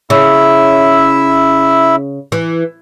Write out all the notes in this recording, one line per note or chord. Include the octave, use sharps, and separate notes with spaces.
C#3 E4 E5
E3